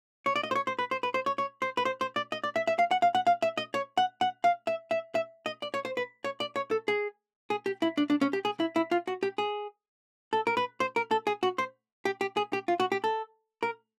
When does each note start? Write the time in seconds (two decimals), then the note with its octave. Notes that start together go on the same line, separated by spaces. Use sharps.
0.26 C#5
0.36 D5
0.43 D#5
0.51 C5
0.55 C#5
0.67 C5
0.79 B4
0.91 C5
1.03 B4
1.14 C5
1.26 C#5
1.38 C#5
1.62 C5
1.77 B4
1.85 C5
2.01 C5
2.16 D5
2.32 D#5
2.44 D5
2.56 E5
2.67 E5
2.79 F5
2.91 F#5
3.02 F5
3.15 F#5
3.27 F5
3.42 E5
3.58 D#5
3.74 C#5
3.97 F#5
4.21 F#5
4.44 F5
4.67 E5
4.91 E5
5.15 E5
5.46 D#5
5.62 D5
5.74 C#5
5.85 C5
5.97 B4
6.24 C#5
6.40 D5
6.56 C#5
6.71 A4
6.88 G#4
7.50 G#4
7.66 G4
7.82 E4
7.97 D4
8.10 D4
8.21 C#4
8.33 G4
8.45 G#4
8.60 E4
8.76 E4
8.91 F4
9.07 F#4
9.23 G4
9.38 G#4
10.33 A4
10.47 A#4
10.57 B4
10.80 C5
10.96 A#4
11.11 A4
11.27 G#4
11.43 F#4
11.58 C5
12.05 G4
12.21 G4
12.37 G#4
12.53 G4
12.68 F4
12.80 F#4
12.92 G4
13.04 A4
13.63 A#4